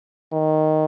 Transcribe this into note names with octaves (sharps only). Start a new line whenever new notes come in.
D#3